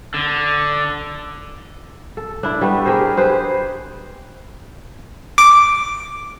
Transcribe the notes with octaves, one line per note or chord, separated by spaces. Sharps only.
D3
A4
D4 E4
G3 A3 B3
G4 G#4 A#4 C5
G4 G#4 B4 C5
D6